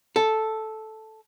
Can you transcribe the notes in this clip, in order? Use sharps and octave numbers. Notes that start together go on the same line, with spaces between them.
A4